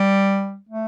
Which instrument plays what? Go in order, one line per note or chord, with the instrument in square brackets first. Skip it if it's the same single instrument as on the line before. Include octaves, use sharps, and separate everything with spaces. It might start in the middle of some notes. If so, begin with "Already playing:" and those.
Already playing: [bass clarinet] G3
A3